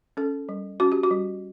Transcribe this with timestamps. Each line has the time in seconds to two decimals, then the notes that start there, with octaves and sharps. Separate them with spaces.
0.17 C#4 A4
0.49 G3
0.80 C#4 F#4
0.92 G4
1.04 F#4
1.11 G3